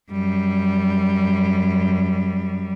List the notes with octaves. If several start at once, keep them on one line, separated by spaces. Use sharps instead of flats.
F#2 G3